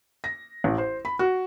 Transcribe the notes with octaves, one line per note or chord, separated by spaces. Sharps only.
A#6
A1
C5
B5
F#4